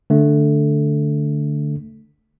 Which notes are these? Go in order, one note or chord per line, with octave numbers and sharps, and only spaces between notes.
D3 A3